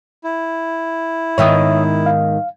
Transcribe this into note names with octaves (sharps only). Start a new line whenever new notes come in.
E4
G#2 D#3 B3 C#5 E5 D#6
F5